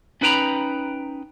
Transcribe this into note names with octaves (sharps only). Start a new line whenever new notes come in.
C#4 D#4 B4 G5 A#5 B5